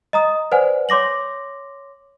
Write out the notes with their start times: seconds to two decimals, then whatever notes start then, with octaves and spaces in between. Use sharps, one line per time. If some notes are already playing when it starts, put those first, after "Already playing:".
0.13 D#5 A#5 D#6
0.52 B4 C5 D5 F#5 G#5
0.89 C#5 C6 D6 A#6 F#7